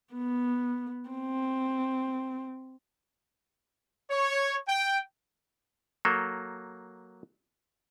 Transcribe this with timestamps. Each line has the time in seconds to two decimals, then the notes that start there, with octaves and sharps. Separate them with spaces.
0.14 B3
1.10 C4
4.10 C#5
4.67 G5
6.05 F#3 A#3 A4